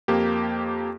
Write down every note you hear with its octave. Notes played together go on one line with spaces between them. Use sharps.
F2 A#3 G4